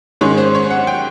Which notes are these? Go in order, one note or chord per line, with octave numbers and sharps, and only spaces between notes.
G#2 D#3 G#3 C#4 C#5
C5
C#5
F#5
G5